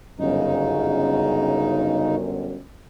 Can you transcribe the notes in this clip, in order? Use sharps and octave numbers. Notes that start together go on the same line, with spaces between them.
G1 F#2 C#3 D#4